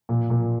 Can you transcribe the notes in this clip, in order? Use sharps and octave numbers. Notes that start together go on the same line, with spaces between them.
A#2
A#2